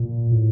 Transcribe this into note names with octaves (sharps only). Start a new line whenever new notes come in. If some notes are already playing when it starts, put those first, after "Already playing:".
Already playing: A#2
A2